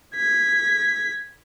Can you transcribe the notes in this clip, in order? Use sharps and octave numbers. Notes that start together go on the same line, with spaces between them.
G#6 B6